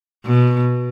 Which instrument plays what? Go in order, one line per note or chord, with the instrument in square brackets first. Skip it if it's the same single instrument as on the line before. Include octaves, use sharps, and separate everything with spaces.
[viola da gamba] B2